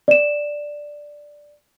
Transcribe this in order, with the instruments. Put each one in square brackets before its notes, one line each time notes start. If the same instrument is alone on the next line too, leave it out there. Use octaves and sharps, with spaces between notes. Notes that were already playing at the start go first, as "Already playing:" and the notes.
[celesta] D5 E7